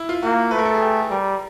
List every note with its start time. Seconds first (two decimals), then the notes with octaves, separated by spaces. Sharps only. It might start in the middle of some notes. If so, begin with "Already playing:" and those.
Already playing: E4
0.09 F4
0.23 A#3 F#4
0.51 A3 B4
0.59 A#4
0.65 A4
0.74 G#4
0.82 G4
1.11 G3 A#4